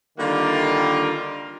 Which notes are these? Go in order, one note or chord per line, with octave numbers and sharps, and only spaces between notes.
D3 D#3 G3 A#3 F4 A#4